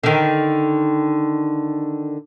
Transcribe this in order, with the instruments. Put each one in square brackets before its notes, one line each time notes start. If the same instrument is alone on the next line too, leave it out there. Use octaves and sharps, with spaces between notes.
[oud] D3 D#3